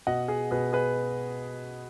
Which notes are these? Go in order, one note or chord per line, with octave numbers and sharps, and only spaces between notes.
B2 D#5 F#5
G#4
B2 G#4 B4
G#4 B4